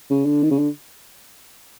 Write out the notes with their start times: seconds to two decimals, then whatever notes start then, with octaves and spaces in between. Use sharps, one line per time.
0.10 C#3
0.26 D3
0.43 D#3
0.51 C#3
0.59 D3